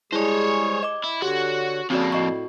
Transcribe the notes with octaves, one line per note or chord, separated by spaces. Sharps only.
G3 G#3 E4 G#4 C5 C#5
D#5 D6
E4
D3 F#4 G4 C#5
F2 A#3 C4 C#4 F#4 G#4 A4 D5
A2 F#4 D#5 C#6